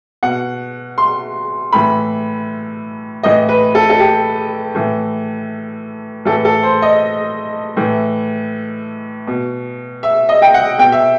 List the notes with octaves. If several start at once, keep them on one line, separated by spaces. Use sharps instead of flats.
B2 F#5
C6
A2 E3 B5
A2 E3 D#5
B4
A4
A4
G4
A2 E3
A2 E3 A4
A4
C5
D#5
A2 E3
B2
E5
D#5
G5
F#5
B2 G5
E5